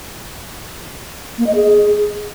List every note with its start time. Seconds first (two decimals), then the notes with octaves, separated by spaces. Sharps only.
1.38 A#3
1.47 D#5
1.55 G#4